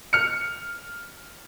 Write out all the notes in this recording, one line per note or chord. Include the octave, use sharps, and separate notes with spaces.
F6 C#7